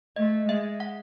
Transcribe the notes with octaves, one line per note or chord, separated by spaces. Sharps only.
A3 D#5
G#3 E5
F#5